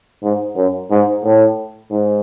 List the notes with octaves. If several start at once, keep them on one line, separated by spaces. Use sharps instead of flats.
G#2
F#2
G#2
A2
G#2